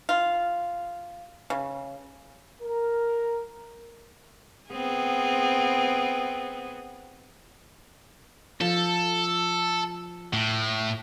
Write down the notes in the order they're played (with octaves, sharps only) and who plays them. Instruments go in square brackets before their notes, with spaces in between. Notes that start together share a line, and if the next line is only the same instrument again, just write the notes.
[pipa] F4
C#3
[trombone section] A#4
[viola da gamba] B3 C4 G#4
[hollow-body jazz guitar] F3 [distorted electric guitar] A4
[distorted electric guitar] A2